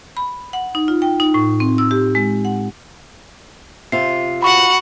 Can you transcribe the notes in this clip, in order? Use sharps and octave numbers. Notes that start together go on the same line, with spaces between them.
B5
F#5
D#4
F4
G5
D#4
A2
C4
E6
G4
G#3
F#5
C3 F4 C7
F#4 F#5 B5 C#6